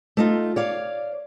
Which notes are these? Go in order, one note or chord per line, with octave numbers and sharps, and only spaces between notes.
A3 D#4 F4
C#5 D5 F5